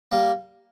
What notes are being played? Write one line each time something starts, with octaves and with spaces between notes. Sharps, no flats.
G3 A#3